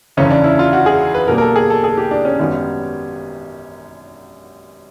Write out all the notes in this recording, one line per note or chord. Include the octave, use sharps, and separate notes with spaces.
F#1 E2 C#3 E3 C#4
D4
E4
F4
F#4
G#4
B4
B1 B2 G3 A#3 A#4
A#4
A4
G#4
A4
G#4
G4
D4
C#4
G#1 F#2 D#3 G3 B3